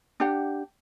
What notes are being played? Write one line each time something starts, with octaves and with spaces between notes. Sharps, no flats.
D4 G4 F#5